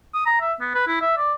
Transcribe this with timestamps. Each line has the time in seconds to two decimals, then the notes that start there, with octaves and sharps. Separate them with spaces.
0.14 D#6
0.26 A#5
0.41 E5
0.61 B3
0.75 B4
0.87 E4
1.01 E5
1.18 D5